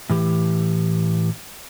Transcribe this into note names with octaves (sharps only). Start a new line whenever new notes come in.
A2 E3 G4